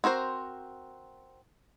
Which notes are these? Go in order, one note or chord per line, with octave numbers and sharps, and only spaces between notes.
C4 F#4 A#4 C5